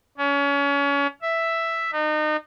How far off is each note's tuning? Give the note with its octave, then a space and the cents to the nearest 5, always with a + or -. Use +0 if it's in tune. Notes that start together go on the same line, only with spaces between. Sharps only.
C#4 +30
E5 +5
D#4 -30